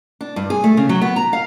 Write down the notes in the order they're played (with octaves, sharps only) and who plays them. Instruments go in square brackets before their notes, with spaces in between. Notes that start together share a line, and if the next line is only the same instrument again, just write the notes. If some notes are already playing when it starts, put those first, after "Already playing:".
[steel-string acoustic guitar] D4
G2
G#4
A3
C#3
F#3
B3
A#5
F5